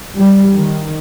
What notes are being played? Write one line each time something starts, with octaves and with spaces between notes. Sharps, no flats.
G3
D#3